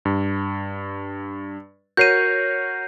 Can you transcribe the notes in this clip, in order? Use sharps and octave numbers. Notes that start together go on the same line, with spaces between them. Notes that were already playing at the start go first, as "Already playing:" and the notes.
G2
F#4 A#4 C#5 G6 C7 D#7